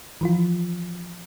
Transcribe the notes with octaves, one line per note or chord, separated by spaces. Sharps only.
E3 F3 F4